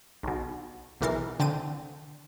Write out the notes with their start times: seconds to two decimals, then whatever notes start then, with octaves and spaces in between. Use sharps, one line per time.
0.23 B1 B2
1.01 B1 E2 E3 A#4 A6 C7
1.39 D3 C4 A6 D7 D#7